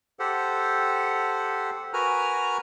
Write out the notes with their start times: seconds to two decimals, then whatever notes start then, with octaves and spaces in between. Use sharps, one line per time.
0.19 G4 A4 C5 F#5
1.93 F#4 A#4 B4 G#5 A#5 F6